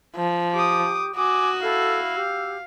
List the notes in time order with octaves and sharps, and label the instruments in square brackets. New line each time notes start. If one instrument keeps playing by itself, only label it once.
[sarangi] F3
[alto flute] G4 [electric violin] D6 D#6
[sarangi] F#4 [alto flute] G#5 [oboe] D6 [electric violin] D#6
[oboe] E4 [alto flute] A4 [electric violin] F5
[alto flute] G4 [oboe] E6